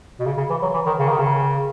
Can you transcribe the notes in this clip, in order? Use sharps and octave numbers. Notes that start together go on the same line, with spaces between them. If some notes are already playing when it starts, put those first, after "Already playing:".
B2
C#3
C#3
E3
F#3
E3
D#3
C#3
D#3
C#3